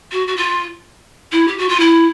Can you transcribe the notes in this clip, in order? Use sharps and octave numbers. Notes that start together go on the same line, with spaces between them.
F#4
F#4
F4
E4
G4
F#4
F4
E4